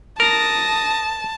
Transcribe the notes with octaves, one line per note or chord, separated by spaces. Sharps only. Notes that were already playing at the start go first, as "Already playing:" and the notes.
A#4 A5 D#6 A#6